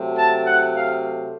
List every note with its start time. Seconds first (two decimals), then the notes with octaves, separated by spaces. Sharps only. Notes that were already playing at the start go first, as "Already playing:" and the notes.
Already playing: C3 F#3 A3
0.16 A5
0.46 F#5
0.76 F5